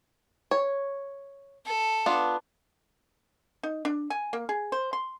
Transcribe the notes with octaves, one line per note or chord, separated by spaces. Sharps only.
C#5
A4
B3 D4 F4
D#4
D4
G#5
A#3
G#4
C5
C6